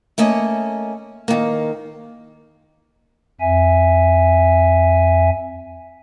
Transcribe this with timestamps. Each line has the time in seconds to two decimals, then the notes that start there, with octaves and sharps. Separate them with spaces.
0.18 A3 A#3 C#4 D#5
1.28 D#3 A#3
3.41 F2 E5 G#5